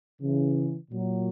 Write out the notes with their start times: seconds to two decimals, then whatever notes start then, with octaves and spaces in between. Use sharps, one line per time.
0.20 C#3 E3
0.90 A#2 F#3